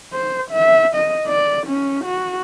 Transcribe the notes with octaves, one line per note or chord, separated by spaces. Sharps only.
C5
E5
D#5
D5
C#4
F#4